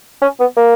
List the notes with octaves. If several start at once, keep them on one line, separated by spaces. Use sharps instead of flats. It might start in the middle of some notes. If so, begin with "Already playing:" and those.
C#4
B3
A#3